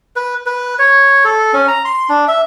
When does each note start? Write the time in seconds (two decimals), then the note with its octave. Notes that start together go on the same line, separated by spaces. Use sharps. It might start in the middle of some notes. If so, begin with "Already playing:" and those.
0.16 B4
0.46 B4
0.79 C#5
1.25 A4
1.53 C#4
1.68 A#5
1.85 C6
2.09 D4
2.28 E5